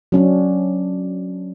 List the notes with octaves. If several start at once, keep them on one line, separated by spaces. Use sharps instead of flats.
F#3 C#4 D4